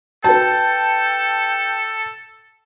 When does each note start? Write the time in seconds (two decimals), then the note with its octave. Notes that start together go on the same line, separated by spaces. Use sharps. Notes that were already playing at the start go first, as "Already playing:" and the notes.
0.24 F#4 A4 B4 G5 A5